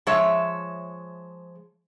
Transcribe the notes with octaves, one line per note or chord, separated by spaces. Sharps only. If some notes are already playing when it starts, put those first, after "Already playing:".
F3 G#3 C#5 E5